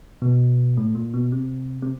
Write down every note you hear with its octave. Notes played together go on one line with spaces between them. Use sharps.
B2
A2
A#2
B2
C3
C3